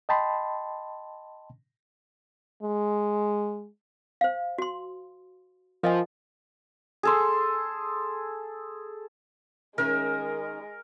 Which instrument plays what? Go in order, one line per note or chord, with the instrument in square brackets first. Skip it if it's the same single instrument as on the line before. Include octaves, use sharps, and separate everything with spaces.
[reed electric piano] D#5 G5 A5 B5 C6
[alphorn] G#3
[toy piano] C5 F5
F#4 C6
[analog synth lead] F3 [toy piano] A#4 D#5 G#5
[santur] G#4 A4 C6
[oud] D#3 C#4 [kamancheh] G#3 [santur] A#4